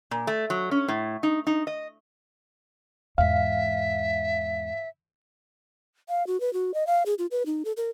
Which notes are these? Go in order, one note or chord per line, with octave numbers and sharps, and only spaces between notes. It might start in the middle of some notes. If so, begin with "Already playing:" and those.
A#2
A3
F#3
C#4
A2
D#4
D#4
D#5
E2 G#2 E5 F5
F5
F#4
B4
F#4
D#5
F5
G#4
F4
B4
D#4
A4
A#4